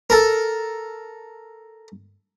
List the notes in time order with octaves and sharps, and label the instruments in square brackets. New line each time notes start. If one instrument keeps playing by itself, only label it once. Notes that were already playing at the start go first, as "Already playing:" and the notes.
[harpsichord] A4 A#4